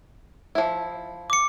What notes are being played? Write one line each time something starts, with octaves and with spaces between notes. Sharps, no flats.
F3 E4
D6 C#7